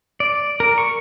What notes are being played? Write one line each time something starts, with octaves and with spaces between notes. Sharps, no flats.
D5
A#4
C#6